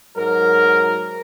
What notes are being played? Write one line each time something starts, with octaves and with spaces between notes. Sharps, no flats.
G#2 F#3 A#4